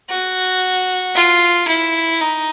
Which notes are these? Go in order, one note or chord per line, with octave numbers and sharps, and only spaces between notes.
F#4
F4
E4
D#4